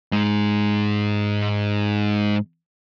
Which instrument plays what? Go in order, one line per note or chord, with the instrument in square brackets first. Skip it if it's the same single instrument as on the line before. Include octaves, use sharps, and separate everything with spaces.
[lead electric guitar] G#2 G#3